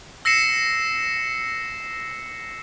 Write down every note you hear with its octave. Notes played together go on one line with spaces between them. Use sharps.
E6 A#6 C7 C#7 E7